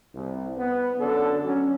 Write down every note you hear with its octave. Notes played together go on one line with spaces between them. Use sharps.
C2
B3
F#2 D3 D4 A4
F#3 C#4